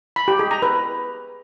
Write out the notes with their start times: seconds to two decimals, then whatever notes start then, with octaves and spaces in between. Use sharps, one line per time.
0.16 B5
0.28 G4
0.39 G#4
0.51 A#5
0.62 B4